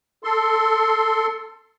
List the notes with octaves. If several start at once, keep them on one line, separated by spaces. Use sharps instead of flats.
A4 C6